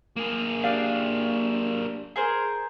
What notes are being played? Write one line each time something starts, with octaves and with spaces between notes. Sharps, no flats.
A#3 G#4
D4 G4 F5
G#4 A#4 C5